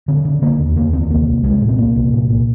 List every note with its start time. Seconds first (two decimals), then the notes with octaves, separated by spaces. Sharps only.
0.08 D3 C4
0.25 D3
0.42 D3 A#3
0.60 D#2
0.76 D#2 A#3
0.93 D#2 C4
1.10 C2 A#3
1.27 C2
1.44 C2 G#3
1.61 A#2
1.69 C4
1.78 A#2 A#3
1.96 C2
2.13 A#2
2.30 A#2